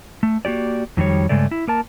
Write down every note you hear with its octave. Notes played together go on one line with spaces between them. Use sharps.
A3
A#3 F#4 G4 D5
F2 D#3 F#3 G3 C#5
G2 C#3 G#3 A3 D5
E4
A#3 A#4 A5